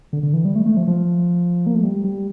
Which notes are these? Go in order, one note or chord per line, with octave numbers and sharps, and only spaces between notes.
D3
D3
E3
G3
A3
A3
F3
F3
A#3
A3
G3
G3